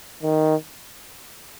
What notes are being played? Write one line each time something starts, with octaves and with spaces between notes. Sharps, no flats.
D#3